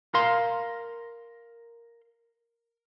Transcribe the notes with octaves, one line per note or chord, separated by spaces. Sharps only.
A#4 F5 C6